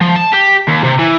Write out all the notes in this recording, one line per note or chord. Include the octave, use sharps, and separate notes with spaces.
F3
A5
G4
D#2
C3
E3